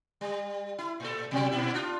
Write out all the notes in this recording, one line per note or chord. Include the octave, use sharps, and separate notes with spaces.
G3
E4
A2 A4
B2 F#3 G3
A#2 E4
D4 F4